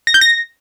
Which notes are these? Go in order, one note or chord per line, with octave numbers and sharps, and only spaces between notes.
A#6
G6
A#6